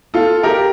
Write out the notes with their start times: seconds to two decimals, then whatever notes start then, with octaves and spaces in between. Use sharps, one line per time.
0.14 F4 A4
0.43 G4 A#4